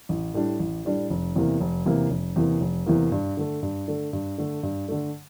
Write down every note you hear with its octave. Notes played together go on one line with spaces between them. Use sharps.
A1
A2 G3 D4
A1
A2 G3 D4
F1
E2 C3 E3 A#3
F1
E2 C3 E3 A#3
F1
E2 C3 E3 A#3
F1
E2 C3 E3 A#3
G2
D3 A3
G2
D3 A3
G2
D3 A3
G2
D3 A3